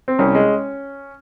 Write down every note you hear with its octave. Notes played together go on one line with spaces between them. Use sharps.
C4
C2 C#4
G#3